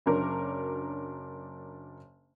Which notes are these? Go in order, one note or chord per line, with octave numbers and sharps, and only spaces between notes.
F#1 F#3 D4 A#4